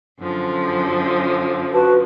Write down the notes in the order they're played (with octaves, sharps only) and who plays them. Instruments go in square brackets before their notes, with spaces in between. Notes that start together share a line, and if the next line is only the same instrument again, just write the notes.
[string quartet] F#2 D3 F3
[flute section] F#4 B4 A5